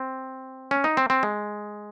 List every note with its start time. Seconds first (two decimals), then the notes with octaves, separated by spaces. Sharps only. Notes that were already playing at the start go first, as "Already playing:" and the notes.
Already playing: C4
0.71 C#4
0.84 D#4
0.97 C4
1.10 C4
1.23 G#3